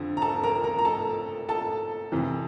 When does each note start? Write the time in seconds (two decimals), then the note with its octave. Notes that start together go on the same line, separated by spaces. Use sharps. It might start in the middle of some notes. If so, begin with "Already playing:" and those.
Already playing: F2 D3 F3
0.17 A#5
0.22 A4 A5
0.44 A#4 A#5
0.64 A#4 A#5
0.78 A#5
0.85 A4 A5
1.49 A4 A5
2.12 F2 C3 E3